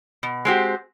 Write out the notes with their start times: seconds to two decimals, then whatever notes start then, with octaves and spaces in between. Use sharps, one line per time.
0.23 B2
0.45 G#3 C4 F#4 G4